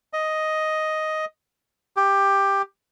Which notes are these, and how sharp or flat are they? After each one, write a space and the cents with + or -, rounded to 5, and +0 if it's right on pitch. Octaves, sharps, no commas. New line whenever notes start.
D#5 +5
G4 +10